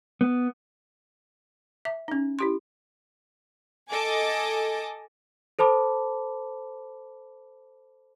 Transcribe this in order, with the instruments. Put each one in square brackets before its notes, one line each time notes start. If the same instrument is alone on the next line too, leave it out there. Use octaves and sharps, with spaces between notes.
[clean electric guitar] B3
[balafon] E5
C#4 D#4
E4 G4 C6
[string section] A4 D#5 G#5 A5 D6
[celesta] A4 C5 A5 B5 D6